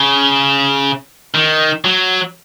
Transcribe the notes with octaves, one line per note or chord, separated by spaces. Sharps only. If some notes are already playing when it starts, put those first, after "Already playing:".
Already playing: C#3
D#3
F#3